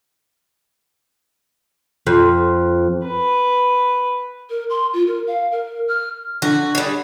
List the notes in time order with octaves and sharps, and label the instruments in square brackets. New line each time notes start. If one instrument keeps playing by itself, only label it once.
[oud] F2
[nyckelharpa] B4
[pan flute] A#4
C6
F4
A#4
F5
A#4
F6
[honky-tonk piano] D3 [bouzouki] F#4
[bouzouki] G3 G#4